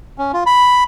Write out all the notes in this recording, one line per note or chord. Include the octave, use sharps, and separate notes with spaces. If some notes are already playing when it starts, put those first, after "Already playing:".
C#4
F4
B5